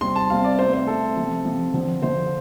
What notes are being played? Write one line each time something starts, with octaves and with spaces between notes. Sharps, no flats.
C3 G3 C4 C6
A5
C3 G3 C4 F5
D5
C3 A3 C4 C5
C5
C3 A3 C4 A4
C3 F3 C4
C3 F3 C4
D3 F3 C4
D3 F3 C4 C5